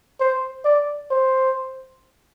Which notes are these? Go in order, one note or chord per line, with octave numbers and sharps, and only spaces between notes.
C5
D5
C5